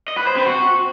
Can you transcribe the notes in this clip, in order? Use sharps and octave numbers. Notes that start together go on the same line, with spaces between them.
D#5
B4
C5
C4
F#4